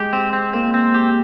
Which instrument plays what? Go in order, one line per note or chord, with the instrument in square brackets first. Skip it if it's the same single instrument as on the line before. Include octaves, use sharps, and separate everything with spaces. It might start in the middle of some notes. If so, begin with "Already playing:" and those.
Already playing: [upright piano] G#3 [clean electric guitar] G4
[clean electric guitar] C4
C4
[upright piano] A#3 [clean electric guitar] C4
[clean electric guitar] C4
G4